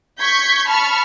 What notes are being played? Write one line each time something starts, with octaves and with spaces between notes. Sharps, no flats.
C#6 G6 G#6 B6
A5 B5 C#6 F6